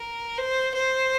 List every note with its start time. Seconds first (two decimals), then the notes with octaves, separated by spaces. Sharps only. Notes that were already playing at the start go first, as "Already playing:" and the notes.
Already playing: A#4
0.38 C5
0.74 C5